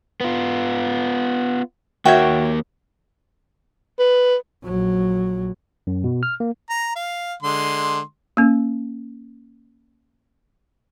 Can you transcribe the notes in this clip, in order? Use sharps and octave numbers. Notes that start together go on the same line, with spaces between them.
B3 F4
D#2 A#3 F#4 C#5 E5 G5
B4
A#1 F#3
F#2
B2
F6
A#3
A#5
F5
D3 G#3 C6
A#3 C#4